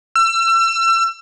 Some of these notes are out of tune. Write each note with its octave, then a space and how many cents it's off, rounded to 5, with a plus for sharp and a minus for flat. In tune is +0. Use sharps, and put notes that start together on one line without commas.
E6 +35